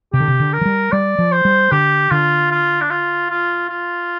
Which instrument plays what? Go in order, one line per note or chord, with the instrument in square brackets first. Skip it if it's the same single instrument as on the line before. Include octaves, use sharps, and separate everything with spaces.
[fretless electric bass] C3 [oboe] G4
[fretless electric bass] D3
C3
D3
[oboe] A#4
[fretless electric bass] F3
G3
[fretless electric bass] G3 [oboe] D5
[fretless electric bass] F3
[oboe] C5
[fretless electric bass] G3
[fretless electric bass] D3 [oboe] G4
[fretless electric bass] D3 [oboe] F4
[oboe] F4
D4
F4
F4
F4